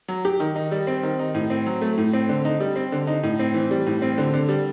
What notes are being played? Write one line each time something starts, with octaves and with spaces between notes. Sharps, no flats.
F#3
G4
D#3
D#4
G3
C4
D#3
D#4
A2
C4
F#3
A3
A2
C4
D3
D#4
G3
C4
D3
D#4
A2
C4
E3
G3
A2
C4
D3
D3
G3